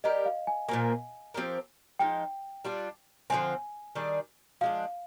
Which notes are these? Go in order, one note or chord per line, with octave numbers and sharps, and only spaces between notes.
G3 D4 G4 A#4 D#5
F5
G#5
A#2 F3 A#3 G#5
F3 C4 G4 A#4
F3 G#3 D#4 G5
G3 D4 F4
D3 F3 G#3 C4 G#5
D#3 G3 D4 G#4
F3 G#3 D4 F5